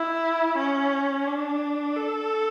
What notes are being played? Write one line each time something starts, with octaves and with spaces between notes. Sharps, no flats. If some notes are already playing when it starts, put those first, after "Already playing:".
Already playing: E4
C#4
D4
A4